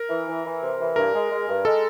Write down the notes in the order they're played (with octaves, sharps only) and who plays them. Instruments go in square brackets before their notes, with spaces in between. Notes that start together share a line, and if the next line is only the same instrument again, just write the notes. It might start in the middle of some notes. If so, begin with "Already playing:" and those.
Already playing: [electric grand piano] A#4
[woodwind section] E3
E3
E3
C3
E3
[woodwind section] G2 [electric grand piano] A#4
[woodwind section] G#3
G#3
G2
[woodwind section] G#3 [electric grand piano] A4